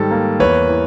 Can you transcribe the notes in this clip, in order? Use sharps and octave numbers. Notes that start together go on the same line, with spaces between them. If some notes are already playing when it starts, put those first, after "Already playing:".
Already playing: G#2 D#3 G3 A4
A#3
E2 B4 C#5
E3